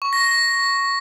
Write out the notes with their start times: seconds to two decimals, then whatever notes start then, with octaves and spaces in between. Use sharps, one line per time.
0.02 C#6
0.13 A#6
0.24 A#6